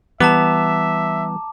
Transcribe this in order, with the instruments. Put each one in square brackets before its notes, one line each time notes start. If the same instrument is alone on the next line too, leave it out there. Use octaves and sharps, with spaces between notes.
[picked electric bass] E3 G3 [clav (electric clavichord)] B3 [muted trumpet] E5 [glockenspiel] A5 A#5 D6